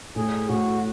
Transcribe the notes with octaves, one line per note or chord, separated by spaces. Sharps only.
A2 G#4
A2 F#4